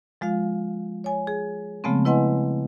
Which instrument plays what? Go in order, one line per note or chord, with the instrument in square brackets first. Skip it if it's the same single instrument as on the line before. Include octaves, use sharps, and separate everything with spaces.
[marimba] F3 G#3 F4 F5
C#5 G#5
G#4
C#3 F3 G#3 A3 B3 C4
E4 B4 D#5 F#5 G#5 C6